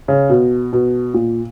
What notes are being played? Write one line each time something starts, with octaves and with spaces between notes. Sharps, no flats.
C#3
B2
B2
A#2